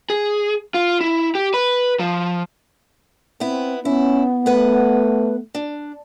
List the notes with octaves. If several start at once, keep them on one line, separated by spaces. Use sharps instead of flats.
G#4
F4
E4
G4
B4
F3
B3 C4 E4
B3 C#4 E4
A3 B4 F#5
D4